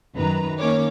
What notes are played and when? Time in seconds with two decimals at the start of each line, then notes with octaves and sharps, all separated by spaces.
0.15 F#2 D#3 B4 A#5
0.59 D#3 A#3 C#4 C#5 D6